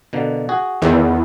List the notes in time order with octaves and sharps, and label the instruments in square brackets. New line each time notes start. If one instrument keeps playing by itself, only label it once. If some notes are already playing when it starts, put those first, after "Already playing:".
[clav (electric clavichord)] B2 D3 A#3
F#4 G#4
[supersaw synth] E2 [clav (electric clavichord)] D#3